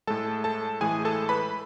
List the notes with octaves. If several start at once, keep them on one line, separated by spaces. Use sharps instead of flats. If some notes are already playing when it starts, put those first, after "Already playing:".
A2 G#3 A4 A5
A4 A5
A2 E3 G#3 G#4 G#5
A4 A5
B4 B5